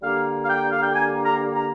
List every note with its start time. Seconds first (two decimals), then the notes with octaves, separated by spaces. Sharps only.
0.01 D3 G3 A#3 F5
0.42 F5
0.47 G5
0.70 F5
0.82 G5
0.93 G#5
1.23 A#5
1.54 A#5